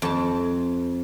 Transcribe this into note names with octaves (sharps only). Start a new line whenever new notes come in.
F2 A5